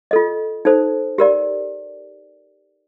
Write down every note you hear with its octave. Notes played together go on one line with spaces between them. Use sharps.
F4 A4 D#5
D#4 A4 C5
G4 A#4 D5